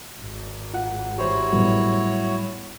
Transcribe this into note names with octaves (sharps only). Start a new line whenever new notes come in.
G#1
F4 F#5
E3 E4 F#4 G4 C5 C#5
A2 F#3 G3 B3